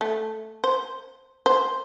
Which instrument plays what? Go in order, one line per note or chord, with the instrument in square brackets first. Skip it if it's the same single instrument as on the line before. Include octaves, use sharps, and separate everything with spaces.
[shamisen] A3
C5
C5